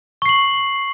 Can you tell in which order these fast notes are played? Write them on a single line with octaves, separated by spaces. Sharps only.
C#6 C7 F#7